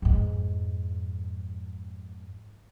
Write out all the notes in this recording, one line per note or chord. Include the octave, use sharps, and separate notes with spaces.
F2 G#2